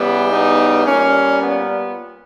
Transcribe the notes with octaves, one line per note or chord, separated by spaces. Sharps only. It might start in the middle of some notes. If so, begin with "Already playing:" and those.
Already playing: C#3 E3 G3 B3
B3 D#4
A#2 G3 A#3 C#4
B3